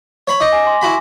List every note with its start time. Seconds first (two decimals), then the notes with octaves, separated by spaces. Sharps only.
0.27 C#5 B5
0.41 D#4 D6 A#6
0.52 G#5
0.66 G#5 C6
0.82 E4 F#4 B5